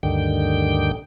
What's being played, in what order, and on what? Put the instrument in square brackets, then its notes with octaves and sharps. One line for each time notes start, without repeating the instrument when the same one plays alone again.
[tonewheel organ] D2 G2 D3 D#3 G5